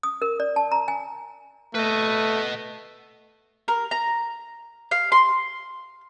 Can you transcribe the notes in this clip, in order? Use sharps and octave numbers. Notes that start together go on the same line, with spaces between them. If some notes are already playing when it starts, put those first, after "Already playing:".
D#6
A#4
D5
A5
A#5
G#5
A3 B4 D#5
A#4
A#5
F5
C6